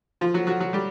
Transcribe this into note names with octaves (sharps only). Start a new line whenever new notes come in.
F3 F4
F#3 F#4
F#3 F#4
F#3 F#4
G3 G4